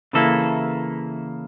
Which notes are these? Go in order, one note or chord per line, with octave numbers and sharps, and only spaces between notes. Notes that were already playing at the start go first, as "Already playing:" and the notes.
C#3 E3 A#3 E4 A4